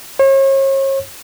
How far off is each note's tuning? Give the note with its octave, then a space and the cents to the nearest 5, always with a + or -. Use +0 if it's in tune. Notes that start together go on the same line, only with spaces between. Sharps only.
C#5 -40